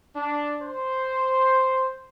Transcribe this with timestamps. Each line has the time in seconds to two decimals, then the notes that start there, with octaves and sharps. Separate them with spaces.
0.16 D4
0.63 C5